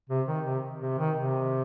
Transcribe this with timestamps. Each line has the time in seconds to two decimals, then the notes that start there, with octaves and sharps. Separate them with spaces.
0.10 C3
0.27 D#3
0.46 C3
0.81 C3
0.98 D#3
1.16 C3